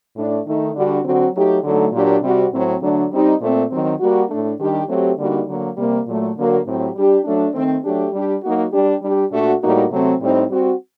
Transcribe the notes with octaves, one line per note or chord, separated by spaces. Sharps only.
A2 A3 D4
D#3 A3 D#4
D3 G3 D4 F#4
D3 F#3 C4 F#4
F#3 A3 D#4 G4
D3 F#3 A3 D#4
A#2 F#3 A#3 D4 G4
C3 G3 C4 F#4
A2 F#3 C4
D3 F#3 A3 D4
G3 C4 D#4 G4
A#2 A3 C4
D#3 F#3 C4
G3 A#3 F#4
A2 A3 D4
D#3 G3 D4 G4
F#3 A3 C4 G4
D3 G3 A#3 D#4 F#4
D3 F#3 A#3
C3 G3 A#3
A#2 F#3 A3
D3 F#3 A#3 F#4
A2 F#3 C4 G4
G3 D4 G4
F#3 A3 D4
D#3 A3 C4
F#3 A3 D4 G4
G3 D4 G4
F#3 A#3 D#4 F#4
G3 D4 G4
G3 D4 G4
A#2 A3 D4 F#4
A2 G3 A#3 D#4 F#4
C3 F#3 A3 C4
A2 G3 C4 D#4
G3 C4 F#4